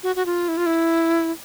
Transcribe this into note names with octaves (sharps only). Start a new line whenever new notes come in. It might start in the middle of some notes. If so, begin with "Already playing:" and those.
F#4
F#4
F4
E4
F4
E4